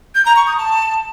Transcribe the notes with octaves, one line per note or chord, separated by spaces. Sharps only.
G6
A#5
C#6
D#6
A5